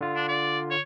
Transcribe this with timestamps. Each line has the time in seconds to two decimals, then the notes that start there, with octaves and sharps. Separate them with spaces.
0.01 D3 F4
0.16 D4
0.28 D5
0.71 C#5